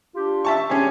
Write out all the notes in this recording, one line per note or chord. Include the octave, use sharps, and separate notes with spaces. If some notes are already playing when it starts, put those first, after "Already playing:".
D4 F4 G4
E5 A5 C#6
C#4 D4 G4 G#4 G#5